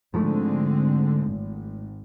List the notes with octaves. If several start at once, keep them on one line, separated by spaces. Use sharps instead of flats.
G#2 D3 F3 G#3 A3 C4
G#1